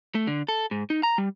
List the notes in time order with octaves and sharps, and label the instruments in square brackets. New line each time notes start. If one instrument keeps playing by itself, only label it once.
[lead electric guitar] A3
D3
A4
G#2
D#4
A#5
G3